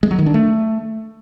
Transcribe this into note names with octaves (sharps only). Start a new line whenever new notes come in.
G#3
F#3
D#3
D4
A3